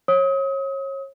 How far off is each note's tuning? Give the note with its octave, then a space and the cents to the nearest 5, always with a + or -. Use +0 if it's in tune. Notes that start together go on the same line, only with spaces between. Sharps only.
C#5 -30 D#6 +35